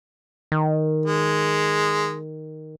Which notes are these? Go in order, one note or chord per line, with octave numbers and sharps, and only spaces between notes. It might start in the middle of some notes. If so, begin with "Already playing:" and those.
D#3
G#3